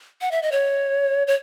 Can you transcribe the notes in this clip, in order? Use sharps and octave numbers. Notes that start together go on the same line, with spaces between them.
F#5
E5
D#5
C#5
C#5